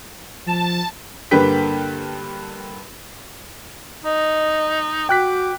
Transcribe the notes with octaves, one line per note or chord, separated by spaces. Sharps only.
F3 A5
G2 D3 A#3 B4 G5 B6
D#4 D#5
F#4 G5 D6 F#6 B6